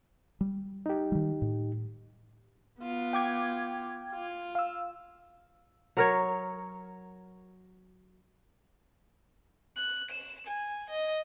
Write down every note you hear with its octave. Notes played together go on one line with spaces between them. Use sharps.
G3
D#4 G4
D#3 G3
A2
B3 F4
G5 D6 G#6
F4
F5 E6
F#3 A#4 C#5
F#6
E7
G#5
D#5